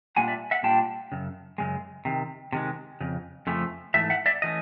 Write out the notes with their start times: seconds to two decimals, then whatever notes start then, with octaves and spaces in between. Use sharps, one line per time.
0.16 A#2 G3 A#3 D4 F4 F#5 G#5
0.28 D5 E5
0.51 E5 F#5
0.63 A#2 G3 A#3 D4 F4 G5 A5
1.12 F#2 C#3
1.58 F#2 C#3 G#3
2.05 C3 D#3
2.53 C3 D#3 G#3
3.01 F2 C#3
3.47 F2 C#3 F3 A3
3.94 G#2 E3 A3 E5
4.10 E5 F#5
4.26 D5 E5
4.42 E3 A3 C#4 D#5